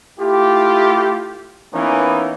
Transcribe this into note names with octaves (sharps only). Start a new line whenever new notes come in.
A3 E4 F4 G4
E3 A#3 B3 C#4 D#4